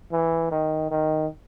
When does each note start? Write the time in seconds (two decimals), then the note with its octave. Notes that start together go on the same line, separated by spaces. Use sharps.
0.12 E3
0.51 D#3
0.91 D#3